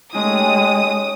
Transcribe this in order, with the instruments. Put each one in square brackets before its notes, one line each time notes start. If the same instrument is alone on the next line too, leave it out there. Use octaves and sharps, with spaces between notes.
[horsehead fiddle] G#3 A3 [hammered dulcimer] C#4 D#4 G4 [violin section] D#6